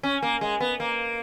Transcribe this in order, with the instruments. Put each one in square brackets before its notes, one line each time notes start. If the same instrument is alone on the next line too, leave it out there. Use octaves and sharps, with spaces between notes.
[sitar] C#4
A#3
G#3
B3
A#3